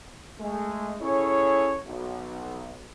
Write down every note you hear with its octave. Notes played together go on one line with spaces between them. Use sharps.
G#3 A3
C#4 E4 G#4 A4 C#5
B1